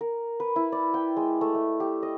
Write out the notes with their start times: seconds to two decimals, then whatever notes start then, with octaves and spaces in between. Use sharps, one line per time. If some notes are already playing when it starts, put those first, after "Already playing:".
0.01 A#4
0.40 B4
0.56 E4
0.72 D5
0.94 G5
1.17 G#3
1.41 A3
1.55 A3
1.80 G4
2.03 D#5